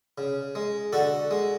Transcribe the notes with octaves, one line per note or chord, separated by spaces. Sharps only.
C#3
G#3
D3 F#4 A4
G#3